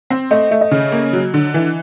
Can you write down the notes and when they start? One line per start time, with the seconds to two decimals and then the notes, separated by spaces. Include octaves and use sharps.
0.10 C4
0.31 A3 D#5
0.51 A3 E5
0.61 D#5
0.71 C#3
0.92 A#3
1.13 F#3
1.34 D3
1.54 E3